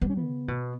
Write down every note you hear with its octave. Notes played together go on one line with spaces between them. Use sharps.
G3 B3
C#4
B3
C#3
B2